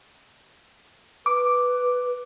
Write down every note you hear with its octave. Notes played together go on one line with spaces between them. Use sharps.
B4 D6